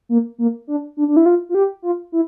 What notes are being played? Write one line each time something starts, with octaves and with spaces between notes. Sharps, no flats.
A#3
A#3
D4
D4
D4
E4
F4
F4
G4
F4
E4